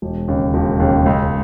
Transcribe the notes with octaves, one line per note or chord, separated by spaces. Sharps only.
E1
D#2 C#3
E1
D#2 C#3
C#2